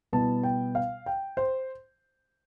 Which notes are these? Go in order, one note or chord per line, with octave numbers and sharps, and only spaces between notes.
B2 G3 B3 E4 A5
G5
F5
G5
C5